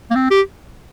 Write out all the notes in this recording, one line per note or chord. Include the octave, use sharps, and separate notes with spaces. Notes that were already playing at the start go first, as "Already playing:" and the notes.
A#3
C4
G4